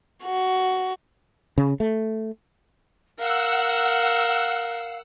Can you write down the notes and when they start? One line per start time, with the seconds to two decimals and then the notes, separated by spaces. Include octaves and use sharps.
0.23 F#4
1.58 C#3
1.80 A3
3.19 A#4 F5 F#5 E6